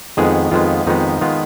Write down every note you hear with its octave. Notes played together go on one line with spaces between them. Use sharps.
F2 D#3 G#3 B3 G#4
F2 D#3 G#3 B3 F4
F2 D#3 G#3 B3 D#4
D#3 G#3 B3 F4